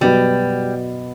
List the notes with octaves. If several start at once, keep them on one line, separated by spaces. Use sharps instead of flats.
B2 F#3 G3 B3